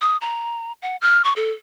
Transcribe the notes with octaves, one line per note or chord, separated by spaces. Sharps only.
D#6
A#5
F#5
F6
C#6
A4